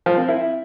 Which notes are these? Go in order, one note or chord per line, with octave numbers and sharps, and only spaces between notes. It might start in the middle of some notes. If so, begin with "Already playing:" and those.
F3
C4
E4